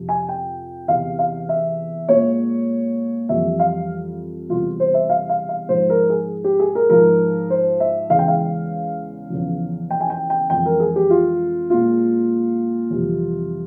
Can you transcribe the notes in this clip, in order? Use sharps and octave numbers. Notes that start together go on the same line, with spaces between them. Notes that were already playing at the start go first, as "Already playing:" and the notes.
Already playing: F2 C3 F3
G#5
G5
E2 C3 E3 F5
F5
E5
A#2 G#3 C#5
F2 E3 G3 E5
F5
E2 C3 G3 F4
C5
E5
F5
F5
F5
G#2 F3 G#3 C5
A#4
G#4
G4
G#4
A#4
G#2 F3 G#3 A#4
C5
E5
E2 C#3 E3 G#3 F5
G5
F5
E2 C#3 F3
G5
G#5
G5
G5
F2 E3 G#3 G5
A#4
G#4
G4
F4
A#2 G#3 F4
F2 C3 E3 G3